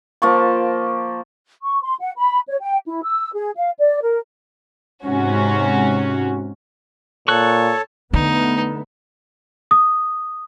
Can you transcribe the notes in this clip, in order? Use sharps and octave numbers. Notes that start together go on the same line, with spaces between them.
F3 A#3 A5 C#6
C#6
C6
F#5
B5
C#5
G5
E4
E6
G#4
F5
D5
A#4
G#2 C3 C#4 F#4
A#2 A4 C#5 A5 C#6 F#6
F2 D3 A3 B3 D#4
D#6